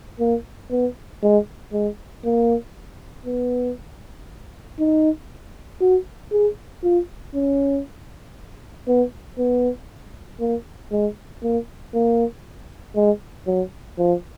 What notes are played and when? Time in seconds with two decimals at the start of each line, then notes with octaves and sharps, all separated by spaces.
0.20 A#3
0.71 B3
1.23 G#3
1.73 G#3
2.25 A#3
3.26 B3
4.79 D#4
5.81 F#4
6.32 G#4
6.83 F4
7.34 C#4
8.87 B3
9.39 B3
10.40 A#3
10.92 G#3
11.43 A#3
11.94 A#3
12.96 G#3
13.47 F#3
13.98 F3